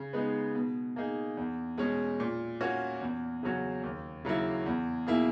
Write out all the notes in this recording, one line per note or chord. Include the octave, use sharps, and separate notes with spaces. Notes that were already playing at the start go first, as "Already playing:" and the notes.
Already playing: C#3
G#3 B3 D#4
B2
A#3 D#4 G#4
E2
B2 G#3 C#4
A#2
A#3 C#4 F#4
E2
C#3 F#3 C#4 F#4
D#2
C#3 F#3 A#3 E4
E2
B2 A#3 E4 G#4